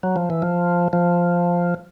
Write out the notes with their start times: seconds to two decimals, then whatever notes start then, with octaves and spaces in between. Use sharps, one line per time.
0.03 F#3
0.16 F3
0.30 E3
0.42 F3
0.93 F3